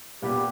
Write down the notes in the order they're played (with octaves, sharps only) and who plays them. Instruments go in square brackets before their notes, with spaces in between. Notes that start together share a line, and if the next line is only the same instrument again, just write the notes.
[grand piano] A#2 G3 B3 [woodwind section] G4